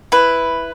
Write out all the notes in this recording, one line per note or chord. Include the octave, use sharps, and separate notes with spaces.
E4 B4